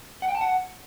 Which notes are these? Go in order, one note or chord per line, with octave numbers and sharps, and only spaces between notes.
F#5
G5
A5
F#5